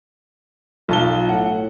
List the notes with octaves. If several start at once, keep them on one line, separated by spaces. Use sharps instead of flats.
B1 F4 A5 G7
A2 F#5